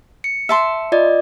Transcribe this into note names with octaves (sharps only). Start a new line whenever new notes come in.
C#7
E5 A5 C6
F4 D5 D#5